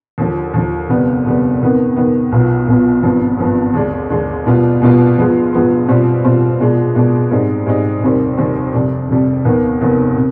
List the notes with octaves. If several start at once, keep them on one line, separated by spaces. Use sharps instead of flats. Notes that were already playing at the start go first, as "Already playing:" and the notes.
D#2 D3 F3
D#2 D3 F3
F1 D#2 D3 G3 B3
F1 D#2 D3 G3 B3
F2 C3 D#3 B3
F2 C3 D#3 B3
B1 B2 B3 F4
B1 B2 B3 F4
G#1 G2 F3 B3
G#1 G2 F3 B3
D#2 D3 G#3 D4
D#2 D3 G#3 D4
B2 G3 B3 D4 F4
B2 G3 B3 D4 F4
G2 F3 G#3 B3 F4
G2 F3 G#3 B3 F4
B2 G3 C4 F4
B2 G3 C4 F4
B2 G#3 D4 F4
B2 G#3 D4 F4
G#2 G3 C4 D#4
G#2 G3 C4 D#4
F1 D#2 D#3 G3 C4
F1 D#2 D#3 G3 C4
F1 F2 C3 G3 D4
F1 F2 C3 G3 D4
F1 D#2 D#3 B3
F1 D#2 D#3 B3
C3